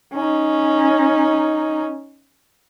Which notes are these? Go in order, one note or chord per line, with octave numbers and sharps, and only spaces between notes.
C#4 D#4